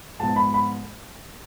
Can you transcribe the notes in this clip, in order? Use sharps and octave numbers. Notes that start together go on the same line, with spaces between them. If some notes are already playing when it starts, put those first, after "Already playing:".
G#2 F3 G#3 B3 A5
B5
B5